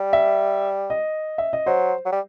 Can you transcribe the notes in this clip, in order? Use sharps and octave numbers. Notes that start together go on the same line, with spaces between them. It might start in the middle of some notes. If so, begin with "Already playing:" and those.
Already playing: G3
E5
D#5
E5
D#5
F#3 C5
F#3
G3